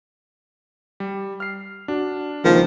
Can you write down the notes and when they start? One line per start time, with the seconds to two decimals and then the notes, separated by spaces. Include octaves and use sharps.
1.00 G3
1.40 F6 C7
1.88 D4 F#4
2.44 C#2 D#3 F3 A#3